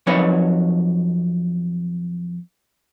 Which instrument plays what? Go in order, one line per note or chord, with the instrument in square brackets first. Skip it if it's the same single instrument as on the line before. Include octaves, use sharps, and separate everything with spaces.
[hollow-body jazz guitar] F2 F#3 D#4 B4 C#5 B5